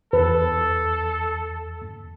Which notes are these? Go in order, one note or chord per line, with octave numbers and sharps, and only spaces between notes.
E2 A4 B4